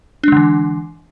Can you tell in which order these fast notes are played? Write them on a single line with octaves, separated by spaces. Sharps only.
D4 G#3 D3 E3